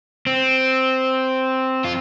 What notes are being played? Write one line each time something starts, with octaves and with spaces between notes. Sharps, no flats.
C4
F4